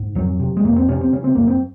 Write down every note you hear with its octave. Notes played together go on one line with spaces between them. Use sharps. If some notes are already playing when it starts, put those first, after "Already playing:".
Already playing: G#2
F2 F#3
C3
G#3
F2 A#3
C4
C3 C#4
C4
C#3 C#4
C4
F#2 A#3
C4